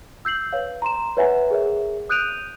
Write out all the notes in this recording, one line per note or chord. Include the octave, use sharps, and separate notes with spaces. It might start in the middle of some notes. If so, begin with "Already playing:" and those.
E6 G6 C7 F#7
B4 C#5 F5
A#5 C6 E7
B4 C#5 E5 F#5 G#5 A#5
G#4 A#4 C#5 E5
D#6 F#6 G6 D7 D#7 F7